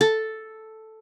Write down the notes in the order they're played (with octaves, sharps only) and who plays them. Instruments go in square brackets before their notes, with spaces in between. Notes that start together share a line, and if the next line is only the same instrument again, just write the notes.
[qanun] A4